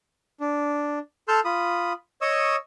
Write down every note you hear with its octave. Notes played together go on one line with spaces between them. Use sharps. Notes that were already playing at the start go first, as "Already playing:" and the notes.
D4
A4 A5 C6 E6 F6 G6
F4 B5 D#6
C#5 D#5 C#6 D#6 E6